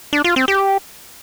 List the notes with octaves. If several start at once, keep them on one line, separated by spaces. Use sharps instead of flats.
D4
F4
C4
G4